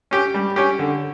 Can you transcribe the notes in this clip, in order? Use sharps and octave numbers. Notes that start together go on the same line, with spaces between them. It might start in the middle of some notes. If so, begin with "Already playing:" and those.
C#4 G4
G3
C#4 G4
D3